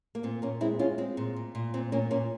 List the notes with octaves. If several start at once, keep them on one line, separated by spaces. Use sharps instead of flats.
A#3
A#2 C4
A#2 A#3 C#4
G#3 C4 E4
G#3 C#4 F4
G#3 C4
A#2
A#2
A#2
A#2 C4
A#2 A#3 C#4
A#2 A#3 C#4